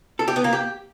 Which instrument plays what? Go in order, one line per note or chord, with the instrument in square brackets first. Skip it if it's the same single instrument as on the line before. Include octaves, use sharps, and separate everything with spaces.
[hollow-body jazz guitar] A4
G4
B3
A#3
G4